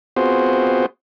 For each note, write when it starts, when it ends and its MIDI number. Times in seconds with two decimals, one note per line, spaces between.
0.16 0.86 59
0.16 0.86 60
0.16 0.86 65
0.16 0.86 66
0.16 0.86 68
0.16 0.86 72